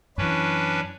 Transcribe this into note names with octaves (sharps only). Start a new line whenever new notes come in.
F#2 E3 C#4 D4 B4